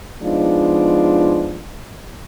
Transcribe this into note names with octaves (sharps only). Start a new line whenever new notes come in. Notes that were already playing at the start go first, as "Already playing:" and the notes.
F3 G#3 B3 D4 D#4 F4